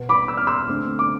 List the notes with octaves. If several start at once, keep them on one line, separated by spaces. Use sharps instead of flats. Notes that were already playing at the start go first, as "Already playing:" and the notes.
Already playing: B2 B3
B5 D6
E6
F6
C6 E6
D3 A3 C4
D6